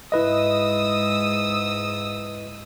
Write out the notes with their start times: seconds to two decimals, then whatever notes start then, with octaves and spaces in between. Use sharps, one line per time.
0.12 G#2 E4 B4 D#5 D#6 E6